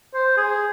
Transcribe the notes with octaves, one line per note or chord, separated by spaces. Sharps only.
C5
G#4